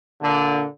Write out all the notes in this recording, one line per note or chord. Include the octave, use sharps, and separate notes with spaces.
A#2 D3